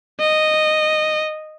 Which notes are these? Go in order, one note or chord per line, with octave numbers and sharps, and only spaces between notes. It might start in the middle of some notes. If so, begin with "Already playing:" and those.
D#5